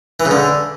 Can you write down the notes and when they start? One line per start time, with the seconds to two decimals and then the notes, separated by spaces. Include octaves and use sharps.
0.20 E3
0.25 C#3
0.31 D3